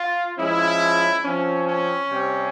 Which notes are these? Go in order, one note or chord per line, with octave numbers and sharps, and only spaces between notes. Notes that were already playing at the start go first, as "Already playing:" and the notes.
Already playing: F4
F3 G#3 C#4 E4
F3 C4 C#4
C#4
C3 G3 C4